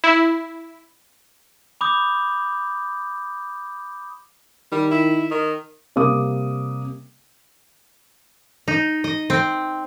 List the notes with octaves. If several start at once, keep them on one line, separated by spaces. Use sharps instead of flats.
E4
B5 D6 D#6 G6
D#3 G3
E4
D#3
C3 G3 A#3 D6 D#6
D#4
D#5
C4